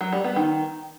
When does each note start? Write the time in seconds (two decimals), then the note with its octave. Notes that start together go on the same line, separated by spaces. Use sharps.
0.01 F#3
0.12 G3
0.24 B3
0.36 D#3